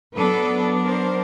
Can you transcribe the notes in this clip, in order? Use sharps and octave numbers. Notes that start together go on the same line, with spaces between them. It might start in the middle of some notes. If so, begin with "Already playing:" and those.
F#3 B3 D4 A4 B4
A#4 C5